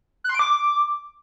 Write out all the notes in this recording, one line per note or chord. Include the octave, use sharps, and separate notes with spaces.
F#6
C6
D7
D6